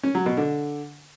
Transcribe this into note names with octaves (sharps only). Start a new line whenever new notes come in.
C#4
F#3
B2
D3